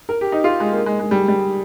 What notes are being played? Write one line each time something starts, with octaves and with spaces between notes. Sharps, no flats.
A#4
G4
D#4
F4
G#3
A#3
G#3
G#3
G3
G3